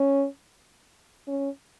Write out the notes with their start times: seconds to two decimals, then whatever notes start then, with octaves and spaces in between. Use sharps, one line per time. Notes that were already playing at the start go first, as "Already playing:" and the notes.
Already playing: C#4
1.27 C#4